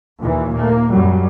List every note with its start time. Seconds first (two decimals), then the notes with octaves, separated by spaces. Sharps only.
0.20 D#2 A#2 E3
0.55 A#3
0.92 F#2 F#3 G3